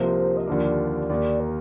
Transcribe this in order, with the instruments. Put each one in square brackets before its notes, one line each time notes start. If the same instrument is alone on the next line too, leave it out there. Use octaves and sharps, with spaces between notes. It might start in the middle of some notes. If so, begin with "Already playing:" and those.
Already playing: [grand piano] C2 C3 F3 A#3 [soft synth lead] C5
[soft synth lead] D#5
[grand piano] D#2 D3 F3 A#3 [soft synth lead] D5
[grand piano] D#2 D#3 A#3 [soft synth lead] D5
[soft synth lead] A#4